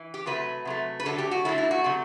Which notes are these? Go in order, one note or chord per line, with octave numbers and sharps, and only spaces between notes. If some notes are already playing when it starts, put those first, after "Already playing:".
Already playing: E3
G4
C3 F#3 A3 B4
C3 F#3 A3
B4
D3 F#3 A3 A4
G4
F#4
D3 F#3 A3 E4
E4
F#4
C3 F#3 A3